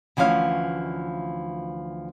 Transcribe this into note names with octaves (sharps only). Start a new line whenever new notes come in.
D2 E3 F3 C#4 F5